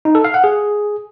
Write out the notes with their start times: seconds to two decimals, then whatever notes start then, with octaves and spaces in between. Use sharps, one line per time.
0.05 D#4
0.15 A4
0.25 F5
0.34 F#5
0.44 G#4